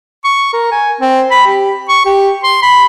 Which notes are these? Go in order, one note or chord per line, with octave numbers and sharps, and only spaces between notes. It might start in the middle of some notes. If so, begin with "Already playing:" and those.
C#6
A#4
G#5
C4
B5
G4
C#6
G4
C6
B5